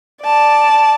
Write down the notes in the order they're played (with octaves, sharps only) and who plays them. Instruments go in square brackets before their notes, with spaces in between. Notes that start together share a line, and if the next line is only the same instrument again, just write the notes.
[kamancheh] D5 A5